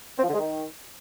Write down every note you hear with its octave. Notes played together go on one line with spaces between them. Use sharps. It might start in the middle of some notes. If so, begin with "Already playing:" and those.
C4
F3
D3
G#3
D#3